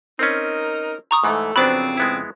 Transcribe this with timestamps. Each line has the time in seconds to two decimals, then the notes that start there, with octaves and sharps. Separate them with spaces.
0.19 C4 C#4 D#4 A#4 D#5
1.11 A#5 C#6 D#6
1.24 G#2 E3 A3
1.56 F2 C#3 F#3 B3 C4 D4 C5 B5
1.97 G#3 B3 E4